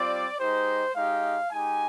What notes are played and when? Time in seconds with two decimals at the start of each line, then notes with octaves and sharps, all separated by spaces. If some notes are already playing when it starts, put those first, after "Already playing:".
Already playing: G3 C4 F4 D5
0.38 G#3 D#4 G4 C5
0.95 G#3 D#4 G4 F5
1.50 G#3 D#4 G4 G#5